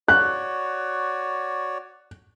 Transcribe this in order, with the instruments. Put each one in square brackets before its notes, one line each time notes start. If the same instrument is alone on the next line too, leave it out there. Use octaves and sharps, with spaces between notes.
[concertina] F#4 C#5 D5 [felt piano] F#6